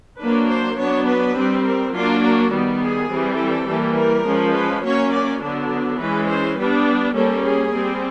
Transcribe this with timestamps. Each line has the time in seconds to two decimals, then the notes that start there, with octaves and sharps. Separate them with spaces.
0.19 F#3 A#3 D4 B4
0.49 C5
0.78 F#3 B3 D4 C#5
1.06 B4
1.36 G3 C4
1.64 A#4
1.93 F#3 A#3 D4 F4
2.22 F#4
2.52 D#3 G3 B3
2.81 G#4
3.10 E3 G3 C4
3.38 A4
3.67 E3 G3 A#3
3.96 A#4
4.25 F3 G#3 C#4
4.55 B4
4.83 F#3 A#3 C#4 C#5
5.13 D5
5.41 D3 F#3 B3 D4
5.99 E3 G#3 C#4 B4
6.28 C5
6.57 G3 B3 D4 B4
7.15 G3 A#3 C#4 A4
7.44 G#4
7.73 G3 C4